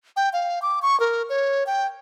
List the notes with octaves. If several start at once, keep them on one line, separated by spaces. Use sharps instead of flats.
G5
F5
D6
C#6
A#4
C#5
G5